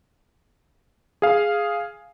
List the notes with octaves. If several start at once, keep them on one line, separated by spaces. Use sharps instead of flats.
G#4 F5